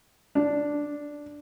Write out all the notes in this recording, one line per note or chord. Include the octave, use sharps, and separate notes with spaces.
D4